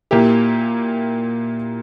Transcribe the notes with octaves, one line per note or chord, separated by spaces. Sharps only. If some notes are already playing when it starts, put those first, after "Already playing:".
A#2 A#3 E4 G4